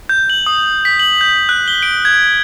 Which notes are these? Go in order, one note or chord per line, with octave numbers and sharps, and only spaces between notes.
G6
F#7
D#6
B6
F#7
G6
F#6
G7
D7
G#6